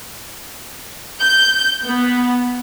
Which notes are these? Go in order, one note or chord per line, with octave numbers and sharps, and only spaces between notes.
G6
B3